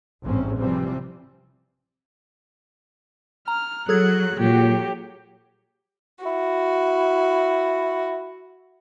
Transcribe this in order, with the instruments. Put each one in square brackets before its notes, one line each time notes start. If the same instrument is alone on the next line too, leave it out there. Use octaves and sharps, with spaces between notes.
[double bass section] A1 E2 G#2 C4 C#4
C3 E3 F3 G3 C4
[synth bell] A#5 [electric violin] F6
[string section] F#3 [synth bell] G#4 A4 G#6 [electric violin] F#6
[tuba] A#2 [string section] F#3 [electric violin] G4
[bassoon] E4 [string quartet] F#4